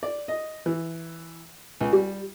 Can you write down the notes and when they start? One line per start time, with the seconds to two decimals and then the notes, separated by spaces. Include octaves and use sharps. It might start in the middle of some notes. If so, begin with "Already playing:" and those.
0.03 D5
0.28 D#5
0.66 E3
1.81 C#2
1.93 G3